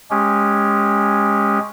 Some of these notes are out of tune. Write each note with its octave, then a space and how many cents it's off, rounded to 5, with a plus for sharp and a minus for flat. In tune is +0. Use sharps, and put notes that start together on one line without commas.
G#3 +0 C#4 +0 G4 +15